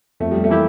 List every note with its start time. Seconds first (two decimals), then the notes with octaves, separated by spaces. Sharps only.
0.20 F2 A3
0.31 G3
0.44 A3
0.49 E3 A#3 E4 G4